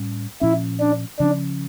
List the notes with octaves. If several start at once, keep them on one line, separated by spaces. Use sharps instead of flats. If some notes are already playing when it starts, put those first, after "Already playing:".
Already playing: A2 G3 C#4
A#2 F3 C#4 E4
D4
C#3 F3 C#4 D4